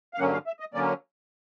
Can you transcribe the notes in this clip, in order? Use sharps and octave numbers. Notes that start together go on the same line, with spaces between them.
F5
G2 D3 F#3 A#3 C#4 F#5
F5
E5
D#5
D3 F#3 A#3 C#4 D5